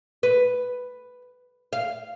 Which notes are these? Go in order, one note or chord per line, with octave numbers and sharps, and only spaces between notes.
B4
F5